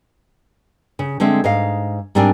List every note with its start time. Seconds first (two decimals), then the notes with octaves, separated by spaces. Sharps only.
0.99 C#3
1.20 D3 G#3 C4 E5
1.44 G#2 D#5 F5
2.15 G#2 G3 C4 D4 A#4 G#5